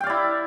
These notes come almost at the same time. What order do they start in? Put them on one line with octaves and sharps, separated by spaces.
G5 F5 D5 E4